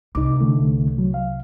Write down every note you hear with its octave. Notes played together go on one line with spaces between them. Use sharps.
C2 D#4 D6
D3 E3 A3
F#3
F5